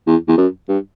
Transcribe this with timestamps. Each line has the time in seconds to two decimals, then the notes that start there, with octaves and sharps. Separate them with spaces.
0.07 E2
0.28 E2
0.37 F#2
0.68 G2